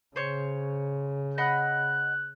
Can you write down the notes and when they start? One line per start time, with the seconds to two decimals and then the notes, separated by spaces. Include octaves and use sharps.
0.16 C#3 C5 C#5
1.38 D#5 F#5 B5 F#6